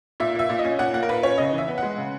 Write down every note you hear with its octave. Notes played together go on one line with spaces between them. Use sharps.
A#2 E5
A#3 E5
A#2
D#5
C#4
A#2 F#5
A#3 F#5
A#4
A#2 B4
C#4 C#5
C#3 D#5
E3
E5
B3
G#3 F#5
C#3